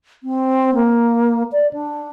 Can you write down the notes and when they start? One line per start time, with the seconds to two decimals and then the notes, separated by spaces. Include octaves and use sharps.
0.23 C4
0.75 A#3
1.52 D5
1.73 D4